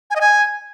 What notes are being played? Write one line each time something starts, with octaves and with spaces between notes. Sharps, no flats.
G#5
D#5
G#5